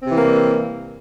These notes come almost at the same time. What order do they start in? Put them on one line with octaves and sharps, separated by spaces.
C4 C3 E3 A#3 G3